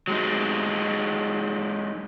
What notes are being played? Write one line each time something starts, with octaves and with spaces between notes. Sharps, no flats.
F#3 G#3 D#4